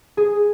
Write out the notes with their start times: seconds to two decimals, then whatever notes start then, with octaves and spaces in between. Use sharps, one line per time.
0.17 G#4